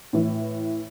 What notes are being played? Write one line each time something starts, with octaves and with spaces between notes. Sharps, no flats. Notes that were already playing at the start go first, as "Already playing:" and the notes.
A2 E3